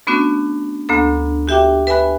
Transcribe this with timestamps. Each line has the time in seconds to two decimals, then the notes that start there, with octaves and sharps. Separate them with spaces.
0.07 A3 B3 C#4 D4 F#4
0.89 D2 A#3 B3 D4 A4
1.48 F#4 G4 E5 G5 D6
1.87 B4 E5 G#5 B5 F#6